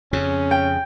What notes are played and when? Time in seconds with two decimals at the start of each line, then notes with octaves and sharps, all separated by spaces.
0.13 F2 C#3 C#4
0.51 G5